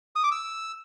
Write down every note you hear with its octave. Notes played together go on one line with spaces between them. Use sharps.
D#6
D6
E6